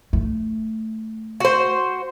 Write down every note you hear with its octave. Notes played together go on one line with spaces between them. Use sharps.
A3
F#4 C5